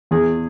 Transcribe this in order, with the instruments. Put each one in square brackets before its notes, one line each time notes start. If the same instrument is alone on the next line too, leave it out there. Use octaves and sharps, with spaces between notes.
[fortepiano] E2 G#4